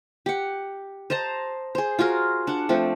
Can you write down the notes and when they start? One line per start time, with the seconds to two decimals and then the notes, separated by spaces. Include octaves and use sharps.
0.26 G4 F#5
1.10 C5 D#5 A5 A#5
1.75 G#4 C5
1.99 F4 F#4 G#4 A#4
2.47 D4 F#5
2.69 F3 A3 C4